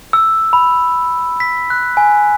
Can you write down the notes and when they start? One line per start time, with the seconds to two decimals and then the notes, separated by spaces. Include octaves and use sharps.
0.13 E6
0.53 B5
1.40 B6
1.70 F#6
1.97 G#5